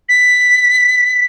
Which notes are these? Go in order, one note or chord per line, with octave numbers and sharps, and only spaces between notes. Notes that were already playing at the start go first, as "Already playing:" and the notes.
B6